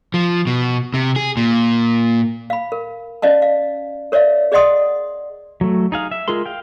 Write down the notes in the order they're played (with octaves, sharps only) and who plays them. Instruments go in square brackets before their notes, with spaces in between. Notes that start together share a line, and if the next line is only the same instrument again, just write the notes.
[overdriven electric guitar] F3
B2
C3
G#4
A#2
[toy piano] F5 B5
A#4
C#4 D5 D#5 F5 A5
F5
A#4 C#5 D5 E5 F5
G#4 D5 D#5 F#5 C6 D#6
[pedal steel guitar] F#3 A3
D#4 G#4 F5
E5
G#3 F4 G#4 A#4 C6
F5 G5